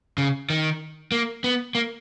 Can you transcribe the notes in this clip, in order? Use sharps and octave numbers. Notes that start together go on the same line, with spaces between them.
C#3
D#3
A#3
B3
A#3